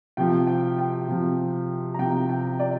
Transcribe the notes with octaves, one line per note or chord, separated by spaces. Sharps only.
C3 F3 G5
G5
G5
C3 F3
A#5
C3 F3 G5
G5
D5